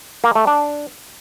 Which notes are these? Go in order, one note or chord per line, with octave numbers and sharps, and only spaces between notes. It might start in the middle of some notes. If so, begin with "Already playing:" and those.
A#3
A3
D4